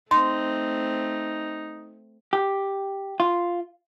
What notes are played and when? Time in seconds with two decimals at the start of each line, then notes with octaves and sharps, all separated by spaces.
0.11 A3 C4 D#4 C6
2.33 G4
3.20 F4